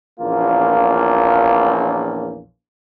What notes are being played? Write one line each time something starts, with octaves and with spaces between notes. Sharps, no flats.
A#1 E2 A#3 C#4 F4